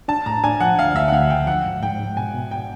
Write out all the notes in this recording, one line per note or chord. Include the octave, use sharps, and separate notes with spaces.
D4 A5
A2 A#5
D4 G#5
F3 F#5
D2 F5
D2 E5
F#5
D2 F5
C#3 G5
F3 F#5
G#2
G#2 G5
G#2
B2 G#5
B2
G5